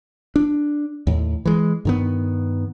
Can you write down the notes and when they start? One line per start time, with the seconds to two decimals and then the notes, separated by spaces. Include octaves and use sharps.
0.36 D4
1.07 D#2 A2
1.45 E3 G#3
1.85 G2 D#3 B3